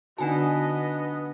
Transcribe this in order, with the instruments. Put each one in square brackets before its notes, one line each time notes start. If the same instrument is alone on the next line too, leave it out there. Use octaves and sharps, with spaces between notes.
[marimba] D3 D#4 F#4 [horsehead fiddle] B3 D#5 [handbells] D4 G#5 A5